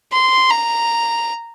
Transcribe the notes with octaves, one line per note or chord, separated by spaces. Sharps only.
C6
A#5